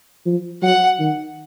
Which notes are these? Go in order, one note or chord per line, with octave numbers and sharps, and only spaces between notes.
F3
F#3 F#5
D#3